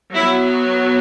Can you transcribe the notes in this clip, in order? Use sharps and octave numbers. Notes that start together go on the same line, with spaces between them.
F#3 B3 E4